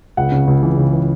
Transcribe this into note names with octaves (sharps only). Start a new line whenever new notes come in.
C#2 F#5
C#3
C#2
E3
C#3
E3